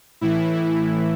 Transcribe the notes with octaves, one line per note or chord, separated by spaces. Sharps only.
A2 E3 E4